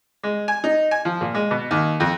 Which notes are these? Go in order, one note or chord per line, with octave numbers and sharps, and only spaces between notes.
G#3
G#5
D#4
G#5
F3
A#2
G#3
B2
D#2
F2